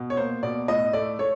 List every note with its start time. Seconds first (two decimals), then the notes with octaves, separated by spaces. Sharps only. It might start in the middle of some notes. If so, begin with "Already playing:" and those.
Already playing: B2
0.10 C#5
0.17 A#3 C5
0.43 B2 D5
0.68 A2 D#5
0.93 A3 D5
1.19 A3 C#5